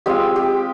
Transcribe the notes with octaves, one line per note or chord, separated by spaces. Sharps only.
G#3 C4 F4 G4
G4